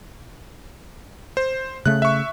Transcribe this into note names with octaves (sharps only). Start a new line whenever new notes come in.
C5
C#3 A3 F#6
E5 C#6